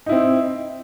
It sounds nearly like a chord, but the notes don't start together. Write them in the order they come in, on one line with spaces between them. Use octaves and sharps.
D#4 E4 C4